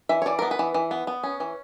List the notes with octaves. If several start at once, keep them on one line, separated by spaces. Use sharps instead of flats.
E3 E5
C#5
E3 D5
B3 A#4
B4
E3
E3
B3
B3
C#4
E3